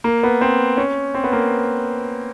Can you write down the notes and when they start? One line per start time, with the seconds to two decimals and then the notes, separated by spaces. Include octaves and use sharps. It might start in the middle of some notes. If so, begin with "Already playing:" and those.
0.04 A#3
0.23 B3
0.41 C4
0.77 C#4
1.15 C4
1.24 B3
1.33 A#3